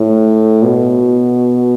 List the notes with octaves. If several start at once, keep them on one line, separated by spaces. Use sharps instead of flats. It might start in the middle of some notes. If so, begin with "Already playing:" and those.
Already playing: A2
B2